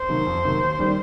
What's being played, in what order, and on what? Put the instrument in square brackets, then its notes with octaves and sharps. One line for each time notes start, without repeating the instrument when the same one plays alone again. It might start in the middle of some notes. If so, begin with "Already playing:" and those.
Already playing: [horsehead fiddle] C5
[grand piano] C3 D#3 F#3 A#3
F2
C3 D#3 F#3 A#3
D#2
D#3 G3 A#3